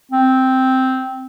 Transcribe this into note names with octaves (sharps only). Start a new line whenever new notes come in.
C4